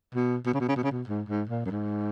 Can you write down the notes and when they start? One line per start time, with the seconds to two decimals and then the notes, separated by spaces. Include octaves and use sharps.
0.15 B2
0.46 B2
0.54 C#3
0.60 B2
0.68 C#3
0.76 B2
0.83 C#3
0.91 B2
1.08 G#2
1.28 G#2
1.49 A#2
1.65 F#2
1.70 G#2